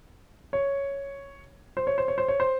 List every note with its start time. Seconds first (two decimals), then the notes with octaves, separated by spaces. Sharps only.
0.53 C#5
1.77 C5
1.87 C#5
1.98 C5
2.08 C#5
2.18 C5
2.28 C#5
2.40 C5